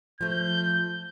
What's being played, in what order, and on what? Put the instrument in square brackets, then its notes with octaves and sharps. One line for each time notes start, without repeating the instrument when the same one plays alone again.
[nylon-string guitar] F3 A3 [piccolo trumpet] G6